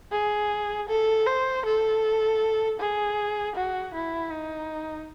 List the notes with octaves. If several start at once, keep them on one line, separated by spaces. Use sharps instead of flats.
G#4
A4
C5
A4
G#4
F#4
E4
D#4